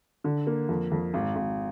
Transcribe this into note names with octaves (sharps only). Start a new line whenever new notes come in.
D3
A#3
F2
F2
G#1
G#1